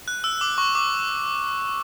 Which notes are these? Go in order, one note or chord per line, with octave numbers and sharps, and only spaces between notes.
F#6
E6
D6
C#6
D6